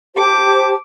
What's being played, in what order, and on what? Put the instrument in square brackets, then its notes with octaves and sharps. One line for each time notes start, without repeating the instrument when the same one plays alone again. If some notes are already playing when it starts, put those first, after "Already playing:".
[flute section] G4 C5 A5 [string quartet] D6